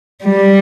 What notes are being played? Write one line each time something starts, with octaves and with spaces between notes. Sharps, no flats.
G3